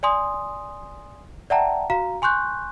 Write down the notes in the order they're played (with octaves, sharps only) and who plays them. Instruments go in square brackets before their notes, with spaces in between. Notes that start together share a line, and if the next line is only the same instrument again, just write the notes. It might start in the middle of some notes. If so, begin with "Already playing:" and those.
[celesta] D5 G#5 C6 D#6
D5 E5 F#5 G5 A5 A#5
F#4 F5 A#5
G#5 C6 C#6 F#6 G6